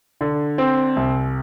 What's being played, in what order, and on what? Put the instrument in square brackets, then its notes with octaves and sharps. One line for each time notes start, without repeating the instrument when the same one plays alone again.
[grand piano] D3
C4
C2